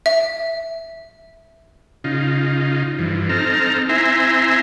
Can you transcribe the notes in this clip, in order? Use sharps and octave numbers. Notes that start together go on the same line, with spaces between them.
E5
C#3 D#4 F4
G2 E3 F3
C4 D#4 A4 A#5 F6
C4 E4 E5 G#5 A#5 C6